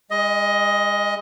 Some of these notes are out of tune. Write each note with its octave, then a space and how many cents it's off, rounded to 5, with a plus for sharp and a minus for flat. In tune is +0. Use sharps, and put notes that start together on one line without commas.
G#3 -35 D#5 +15